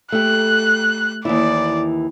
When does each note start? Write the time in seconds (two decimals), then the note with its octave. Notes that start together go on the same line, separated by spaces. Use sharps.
0.12 A3 G4 F#6
1.25 D#2 E3 E4 D5